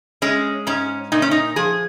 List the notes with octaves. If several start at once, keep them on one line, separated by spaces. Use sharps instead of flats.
G#3 C#4
G#2 C#4
A#2 D#4
C#4
D#4
F3 G#4